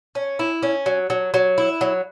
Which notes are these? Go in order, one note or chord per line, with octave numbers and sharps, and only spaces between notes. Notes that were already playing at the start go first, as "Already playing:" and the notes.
C#4
E4
C#4
F#3
F#3
F#3
E4
F#3